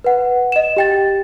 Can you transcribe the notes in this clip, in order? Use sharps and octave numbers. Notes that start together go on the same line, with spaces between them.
B4 F#5
D#5 E7
G4 G5 A6